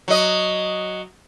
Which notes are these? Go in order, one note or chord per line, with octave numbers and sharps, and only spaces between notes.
F#3 D#5